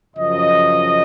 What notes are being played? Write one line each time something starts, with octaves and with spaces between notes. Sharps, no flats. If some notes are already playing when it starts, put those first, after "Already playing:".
F#2 C#3 F3 D#5